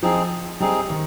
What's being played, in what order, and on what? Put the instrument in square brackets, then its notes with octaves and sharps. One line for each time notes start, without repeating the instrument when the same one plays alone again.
[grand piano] F3 [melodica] C4 D#4 G#4
[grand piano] G3 [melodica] C4 D#4 G#4
[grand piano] D#3